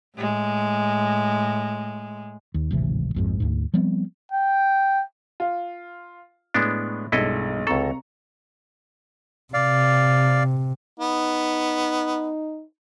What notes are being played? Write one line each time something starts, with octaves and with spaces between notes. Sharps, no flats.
A2 G#3
D#2
D1 G#1 C3 E3
A#1 F2 G#2
D2 G#2
F3 G3 B3 C4
G5
F4
A2 G#3 B3 D4
B1 G2 G#3 E4 A4 D#5
C#2 C3 A4 A#5 C#6
C3 D5 F5
B3 D#4